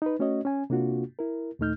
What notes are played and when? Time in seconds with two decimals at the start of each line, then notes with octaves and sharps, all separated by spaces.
0.02 D#4 B4
0.19 A3 C#4 F#4 C#5 D#5
0.45 C#4 G#5
0.70 C3 A#3 D4 F4 F#4
1.19 E4 A#4
1.59 D#2 A#2 A3 D#4 F6 G6